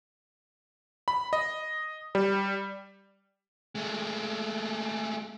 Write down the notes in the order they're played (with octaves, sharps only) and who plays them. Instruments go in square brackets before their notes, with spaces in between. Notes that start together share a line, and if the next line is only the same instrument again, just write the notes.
[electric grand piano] B5
D#5
G3
[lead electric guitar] G#3 A3